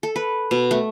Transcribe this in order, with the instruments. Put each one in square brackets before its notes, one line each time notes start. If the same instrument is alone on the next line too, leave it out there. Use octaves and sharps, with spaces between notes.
[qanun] A4
B4
B2
A3